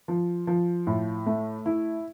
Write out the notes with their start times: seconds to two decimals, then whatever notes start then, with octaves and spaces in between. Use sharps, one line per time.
0.08 F3
0.47 F3
0.87 A2
1.26 A3
1.66 E4